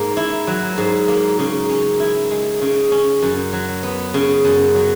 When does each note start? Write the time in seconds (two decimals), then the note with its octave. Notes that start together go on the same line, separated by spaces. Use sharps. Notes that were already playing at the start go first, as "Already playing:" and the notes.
Already playing: G#2 A#3
0.17 E4
0.47 F#3
0.78 G#2
1.08 A#3
1.39 C#3
1.69 C#4
2.00 E4
2.31 G#3
2.61 C#3
2.92 C#4
3.22 F#2
3.53 F#3
3.83 B3
4.14 C#3
4.45 F#2
4.75 F#3